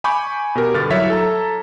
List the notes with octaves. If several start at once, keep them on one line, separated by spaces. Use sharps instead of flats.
G#5 B5 C#6 D6 G6
B2 G4 A#4
G2 D3 F6 A6
F#3 E4 C#5 E5 G#6 B6
A4 A5 A#5